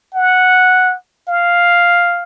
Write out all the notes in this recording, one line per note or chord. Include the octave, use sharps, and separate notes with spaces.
F#5
F5